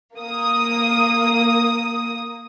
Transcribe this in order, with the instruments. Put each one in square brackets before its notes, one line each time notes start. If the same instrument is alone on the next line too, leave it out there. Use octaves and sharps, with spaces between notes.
[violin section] A#3 D#6